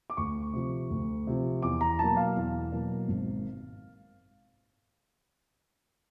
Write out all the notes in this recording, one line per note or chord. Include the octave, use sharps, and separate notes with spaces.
D6
D2 C#6
C3 F3
D2
C3 F3
E2 D6
A#5
B2 F#3 A#3 A5
F5
E2
B2 F#3 A#3
G#1